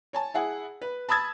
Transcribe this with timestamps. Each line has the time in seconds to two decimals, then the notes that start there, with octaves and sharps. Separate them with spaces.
0.13 C#5 G#5 A5
0.34 E4 G#4 F#5
0.81 B4
1.09 A5 B5 D#6 E6 G#6 A6